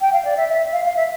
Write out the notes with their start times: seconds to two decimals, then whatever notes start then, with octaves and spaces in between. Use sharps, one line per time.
0.01 G5
0.12 F5
0.24 D5
0.37 E5
0.49 E5
0.72 F5
0.84 F5
0.96 E5